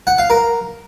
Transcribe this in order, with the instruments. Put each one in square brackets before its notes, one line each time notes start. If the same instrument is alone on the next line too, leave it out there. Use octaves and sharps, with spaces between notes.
[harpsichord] F#5
F5
A#4